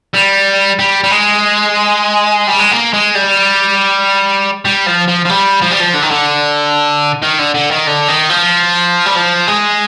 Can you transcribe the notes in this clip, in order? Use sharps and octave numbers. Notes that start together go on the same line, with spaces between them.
G3
G3
G3
G#3
G3
G#3
A#3
G#3
G3
G3
F3
F3
F3
G3
F3
G3
F3
D3
D#3
D3
D#3
D3
D3
D#3
D3
D#3
F3
G3
F3
G#3